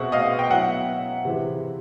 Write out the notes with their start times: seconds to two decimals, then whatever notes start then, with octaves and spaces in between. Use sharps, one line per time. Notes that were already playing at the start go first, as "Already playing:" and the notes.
Already playing: B2 G#3 C4 E5 F#5
0.12 D#5 F5
0.39 G5
0.49 F#3 B3 E4 E5 F#5
1.25 C3 E3 G#3 C4 E4